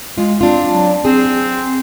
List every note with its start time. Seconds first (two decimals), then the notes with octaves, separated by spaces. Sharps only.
0.18 G#3 F4
0.41 C4 D4 F4
0.70 F#3
1.05 C4 G#4